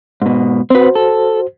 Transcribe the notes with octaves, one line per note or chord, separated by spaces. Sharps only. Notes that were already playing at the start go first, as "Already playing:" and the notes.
G#2 B2
C4 F#4 B4 C5
A4